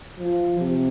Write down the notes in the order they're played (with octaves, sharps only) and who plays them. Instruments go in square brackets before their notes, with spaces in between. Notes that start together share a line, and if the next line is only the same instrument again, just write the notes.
[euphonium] F3
C3